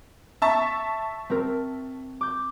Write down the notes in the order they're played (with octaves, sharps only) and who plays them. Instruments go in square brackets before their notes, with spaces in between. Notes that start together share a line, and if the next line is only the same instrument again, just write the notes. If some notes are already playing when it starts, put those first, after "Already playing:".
[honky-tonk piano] E5 A5 C#6
[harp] C4 A#4
D6 G6